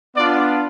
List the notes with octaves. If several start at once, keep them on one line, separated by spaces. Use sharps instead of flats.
B3 D4 F4 D5